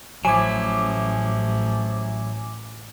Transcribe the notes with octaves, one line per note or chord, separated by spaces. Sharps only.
A1 F3 F#3 E4 G#5 D6